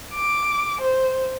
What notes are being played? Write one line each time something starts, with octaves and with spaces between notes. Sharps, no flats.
D6
C5